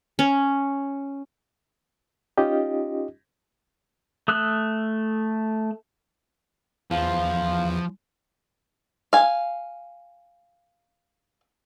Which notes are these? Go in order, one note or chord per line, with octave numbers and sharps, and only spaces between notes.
C#4
C#4 D#4 F4 G4 D#5
A3 D#6 E6 F#6
E2 F3 F5
F5 G#5